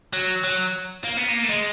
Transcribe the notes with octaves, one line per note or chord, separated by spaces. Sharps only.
F#3
F#3
A#3
B3
A#3
A3
G#3